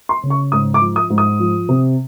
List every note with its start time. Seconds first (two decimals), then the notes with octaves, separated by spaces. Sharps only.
0.09 C6
0.23 C#3
0.30 C#6
0.52 G#2 D#6
0.74 D6
0.81 F3
0.96 D#6
1.10 G#2
1.18 D#6
1.39 F3
1.69 C3